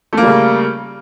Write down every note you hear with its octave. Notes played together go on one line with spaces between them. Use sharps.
C#3 G3 A3 A#3